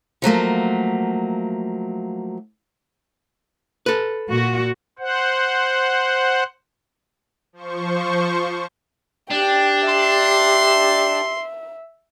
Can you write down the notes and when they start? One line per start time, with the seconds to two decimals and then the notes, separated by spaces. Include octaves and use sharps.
0.22 F3 F#3 A3 A#3
3.86 A4 B4
4.31 A#2 F#4
4.99 C5 F#5
7.53 F3 C5 C#6
9.30 D4 G4 G5
9.89 E5 C6